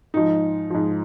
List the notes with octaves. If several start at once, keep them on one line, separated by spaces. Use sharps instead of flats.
G#2 F3 D#4
G#2 F3